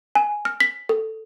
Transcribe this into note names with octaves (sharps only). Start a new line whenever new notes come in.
G#5
F6
B6
A4